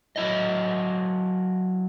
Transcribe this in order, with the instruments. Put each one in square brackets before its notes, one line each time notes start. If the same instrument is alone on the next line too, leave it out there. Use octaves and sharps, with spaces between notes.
[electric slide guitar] F#3 E4 D#5